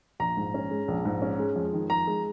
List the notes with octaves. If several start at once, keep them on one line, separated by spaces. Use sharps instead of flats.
A#1 A#5
G#2
C#4
G#3
A#1
G#2
C#4
G#3
F2
D#3
F2 A#5
G#3